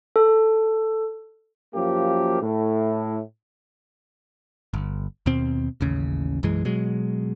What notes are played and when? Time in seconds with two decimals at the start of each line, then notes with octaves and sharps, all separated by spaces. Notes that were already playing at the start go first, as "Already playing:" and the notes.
0.16 A4
1.75 F#2 F3 A#3 G4
2.42 A2
4.74 G1
5.26 D#2 B2 C4
5.81 A1 D#2 C#3
6.43 B1 F#2 E3 G#3
6.65 B2 F#3 G#3